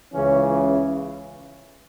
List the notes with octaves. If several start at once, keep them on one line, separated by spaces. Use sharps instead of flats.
C#2 C#3 E3 C#4
E4